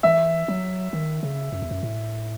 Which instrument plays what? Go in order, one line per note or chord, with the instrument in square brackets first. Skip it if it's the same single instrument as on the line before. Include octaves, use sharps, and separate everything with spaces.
[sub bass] E3 [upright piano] E5
[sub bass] F#3
D#3
C#3
F#2
E2
F#2
A2